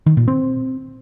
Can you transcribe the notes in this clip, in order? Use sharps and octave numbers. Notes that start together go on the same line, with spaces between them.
D#3
A#2
C4